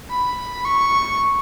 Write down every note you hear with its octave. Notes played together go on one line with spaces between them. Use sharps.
B5
C#6